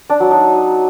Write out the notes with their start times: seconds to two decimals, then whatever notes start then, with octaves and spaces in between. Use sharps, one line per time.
0.10 D4
0.20 F#3
0.31 D#4